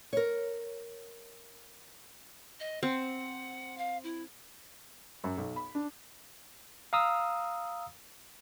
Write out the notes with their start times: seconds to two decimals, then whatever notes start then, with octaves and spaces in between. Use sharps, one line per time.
0.13 A#4 C#5
2.60 D#5
2.83 C4 F#5
3.78 F5
4.03 E4
5.24 F#2
5.38 B1
5.56 B5
5.75 D4
6.93 F5 A#5 D#6 E6